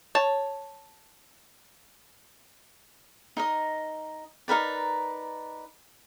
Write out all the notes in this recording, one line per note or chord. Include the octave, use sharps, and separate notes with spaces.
C#5 A5
D#4 A#4 D#5
D#4 A#4 B4 D5